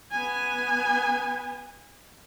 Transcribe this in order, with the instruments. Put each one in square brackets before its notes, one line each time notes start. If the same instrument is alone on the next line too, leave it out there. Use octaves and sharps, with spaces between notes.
[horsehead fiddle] B3 G#5